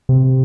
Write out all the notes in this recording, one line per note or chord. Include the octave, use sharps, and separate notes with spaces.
C3